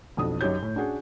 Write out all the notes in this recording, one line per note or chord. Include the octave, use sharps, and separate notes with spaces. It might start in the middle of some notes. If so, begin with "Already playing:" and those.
B1 F2 D4 D#6
F#2 D#4 G4 C#5 G6
A2
C#4 D4 F#4 G#4